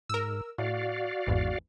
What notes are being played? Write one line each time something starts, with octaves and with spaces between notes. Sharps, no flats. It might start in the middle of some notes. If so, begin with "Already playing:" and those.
G#2 A#4 E6
A2 F#4 D5 F5
G#1 E2 G#2